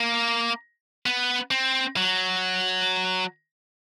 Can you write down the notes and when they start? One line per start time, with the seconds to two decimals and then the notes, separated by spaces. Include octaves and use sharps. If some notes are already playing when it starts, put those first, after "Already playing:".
Already playing: A#3
1.06 B3
1.51 C4
1.97 F#3